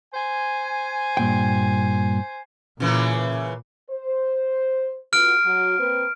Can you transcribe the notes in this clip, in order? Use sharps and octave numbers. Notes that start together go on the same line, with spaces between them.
C5 G#5
G2 A#2 G5
A#2 C#3 E3 A#3
C5
B3 F4 F#4 F6 D7
F#3 F#4
A#3 C4 B4